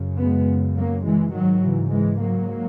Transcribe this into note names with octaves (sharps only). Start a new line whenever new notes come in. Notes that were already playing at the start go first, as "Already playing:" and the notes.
Already playing: F#2 C#3
G#3 B3
F#3 A#3
E3 G#3
G#2 D#3 F#3
C#3 E3
E3 G#3
F#3 A#3